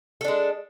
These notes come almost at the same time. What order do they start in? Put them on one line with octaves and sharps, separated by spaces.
A4 D4 G#3